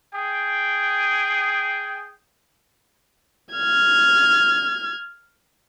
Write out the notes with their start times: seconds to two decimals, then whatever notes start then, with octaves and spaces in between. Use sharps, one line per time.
0.14 G#4 G5
3.54 F6 G#6